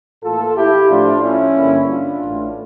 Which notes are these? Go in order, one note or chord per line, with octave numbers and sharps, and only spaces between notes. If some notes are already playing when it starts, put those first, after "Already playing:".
A2 E3 A#3 F4 A4
E4 G4
A2 F3 A3 D4 F4
C#4 E4
G2 D3 G3 A#3
D4 F4
A1 A2 E3 A3